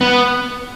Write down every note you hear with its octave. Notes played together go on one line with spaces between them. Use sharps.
B3